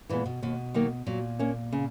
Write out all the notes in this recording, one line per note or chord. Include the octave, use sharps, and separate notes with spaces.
A#2 E3 G#3 B3
B2
D#2 B2
D#3 F#3 A#3
A#2 F#3
A#3 C#4
C#3